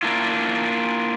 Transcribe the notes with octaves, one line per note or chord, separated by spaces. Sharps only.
A#3 D4 E4 F4